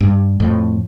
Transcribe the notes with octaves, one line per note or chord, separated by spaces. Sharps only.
G2
F2 A2